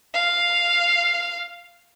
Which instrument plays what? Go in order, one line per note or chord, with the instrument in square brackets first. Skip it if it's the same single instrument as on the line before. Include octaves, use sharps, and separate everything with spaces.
[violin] F5 F6